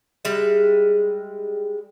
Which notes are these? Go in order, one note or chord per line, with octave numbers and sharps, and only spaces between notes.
G3 G#3 G#4 E5